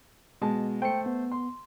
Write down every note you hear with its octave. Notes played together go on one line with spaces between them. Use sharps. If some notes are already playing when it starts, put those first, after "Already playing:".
B2 G#3 A5
A3 C5 G5 C#7
B3
C6